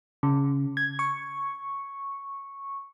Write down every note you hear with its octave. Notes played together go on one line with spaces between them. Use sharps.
C#3
G#6
C#6